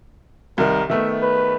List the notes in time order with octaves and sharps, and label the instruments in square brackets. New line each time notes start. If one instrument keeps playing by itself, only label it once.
[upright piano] C2 D#3 [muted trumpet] A#4
[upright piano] D#3 A3 B3 [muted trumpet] E5
[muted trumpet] B4